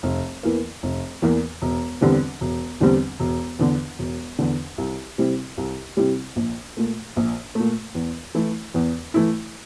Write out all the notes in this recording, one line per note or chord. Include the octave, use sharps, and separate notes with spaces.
F1
E2 E3 A#3
F1
E2 E3 A#3
E1
E2 D3 G3 C4
E1
E2 D3 G3 C4
E1
E2 D3
E1
E2 D3
C2
C3 G3 C4 E4
C2
C3 G3 C4 E4
A#1
A#2 A3
A#1
A#2 A3
E2
E3 A3 E4
E2
E3 A3 E4